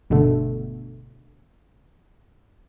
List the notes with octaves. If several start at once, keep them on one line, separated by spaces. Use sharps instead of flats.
G1 B2 D3 A3